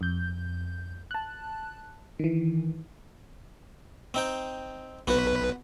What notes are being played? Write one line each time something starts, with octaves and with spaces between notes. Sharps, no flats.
F2 G6
A5 F#6
D#3 E3
C4 D#4 G5
B1 B3 F#4 B4